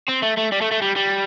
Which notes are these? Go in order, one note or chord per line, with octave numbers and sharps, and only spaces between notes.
C4
A3
A3
G3
A3
A3
G3
G3